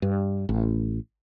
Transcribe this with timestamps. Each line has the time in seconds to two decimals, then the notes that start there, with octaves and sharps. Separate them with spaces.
0.02 G2
0.49 A1